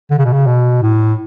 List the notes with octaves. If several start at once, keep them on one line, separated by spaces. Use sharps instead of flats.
D3
C#3
B2
C#3
B2
A2